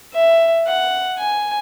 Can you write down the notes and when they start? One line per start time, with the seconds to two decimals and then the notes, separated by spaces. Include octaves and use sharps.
0.13 E5
0.66 F#5
1.18 G#5